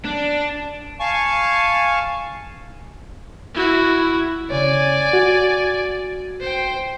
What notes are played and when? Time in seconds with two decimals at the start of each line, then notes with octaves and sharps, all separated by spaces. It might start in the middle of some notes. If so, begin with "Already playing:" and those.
0.05 D4
1.00 F5 G#5 A5 C#6
3.55 E4 F#4
4.50 C#3 C#5 D5 G#5
5.13 F#4
6.41 C5 G5